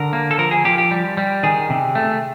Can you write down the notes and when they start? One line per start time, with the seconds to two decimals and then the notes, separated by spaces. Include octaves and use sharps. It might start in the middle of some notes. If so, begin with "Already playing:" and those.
Already playing: D3 A#4
0.13 A#3
0.31 A4
0.38 F3 A#4
0.51 G#4
0.65 F3 G4
0.78 G4
0.91 G3
1.17 G3
1.43 D#3 G#4
1.70 C3
1.95 A3